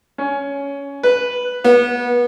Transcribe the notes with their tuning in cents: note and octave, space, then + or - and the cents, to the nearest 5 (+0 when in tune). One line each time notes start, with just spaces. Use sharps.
C#4 +15
B4 +0
B3 -25